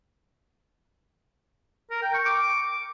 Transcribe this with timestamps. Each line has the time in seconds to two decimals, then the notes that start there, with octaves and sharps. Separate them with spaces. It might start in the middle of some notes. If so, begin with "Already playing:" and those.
1.91 A#4
2.02 G5
2.14 C#6
2.26 D6